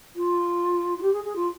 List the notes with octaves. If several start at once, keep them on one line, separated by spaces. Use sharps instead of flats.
F4
F4
G4
G#4
G#4
F4